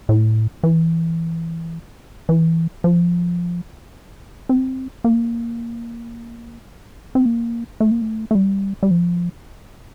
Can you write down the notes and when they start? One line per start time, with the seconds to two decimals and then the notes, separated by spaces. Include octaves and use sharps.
0.09 A2
0.63 E3
2.29 E3
2.84 F3
4.49 C4
5.04 A#3
7.15 C4
7.25 A#3
7.80 A3
7.91 A#3
8.02 A3
8.31 A3
8.35 G3
8.83 G3
8.91 F3